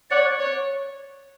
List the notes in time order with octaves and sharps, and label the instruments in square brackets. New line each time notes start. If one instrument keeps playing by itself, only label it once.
[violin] C#5 [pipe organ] D5 F#5
[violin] C#5